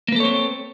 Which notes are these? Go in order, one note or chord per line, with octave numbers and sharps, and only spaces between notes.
A#3 C4 A4 B4 C#5